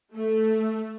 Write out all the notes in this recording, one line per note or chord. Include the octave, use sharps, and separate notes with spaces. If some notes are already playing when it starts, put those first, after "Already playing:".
A3